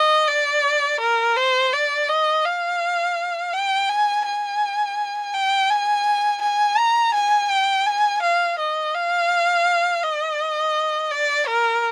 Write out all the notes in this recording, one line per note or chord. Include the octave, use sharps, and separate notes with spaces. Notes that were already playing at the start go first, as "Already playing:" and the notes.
Already playing: D#5
D5
A#4
C5
D5
D#5
F5
G5
G#5
G#5
G5
G#5
G#5
A#5
G#5
G5
G#5
F5
D#5
F5
D#5
D5
A#4